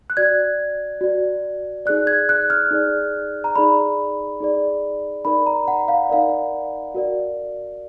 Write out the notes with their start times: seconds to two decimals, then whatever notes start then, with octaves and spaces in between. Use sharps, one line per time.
0.10 F#6
0.17 F#4 D5 G#6
1.01 F#4 D5
1.86 D#4 G#4 D5 F#6
2.07 G#6
2.29 F#6
2.50 F6
2.71 D#4 G#4 D5
3.44 A#5
3.55 D#4 G#4 D5 B5
4.40 D#4 G#4 D5
5.25 D#4 A#4 D5 B5
5.46 A#5
5.68 F#5
5.88 F5
6.09 D#4 A#4 D5 F5
6.95 F#4 A#4 D5